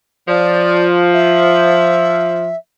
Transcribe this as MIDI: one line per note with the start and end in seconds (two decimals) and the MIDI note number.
0.28 2.52 53
0.28 0.85 74
1.13 2.56 76